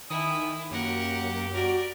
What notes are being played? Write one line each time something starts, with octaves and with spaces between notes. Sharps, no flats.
D#3 E4 G#5 D#6
F#2 A#3 G4 A#4 F#5
F#4 A#4 D5